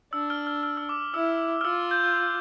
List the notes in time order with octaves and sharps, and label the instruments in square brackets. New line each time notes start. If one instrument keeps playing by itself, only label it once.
[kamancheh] D4 [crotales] E6
[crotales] F6
F6
F6
E6
D6
[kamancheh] E4 [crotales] E6
[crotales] F6
[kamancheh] F4 [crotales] E6
[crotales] G6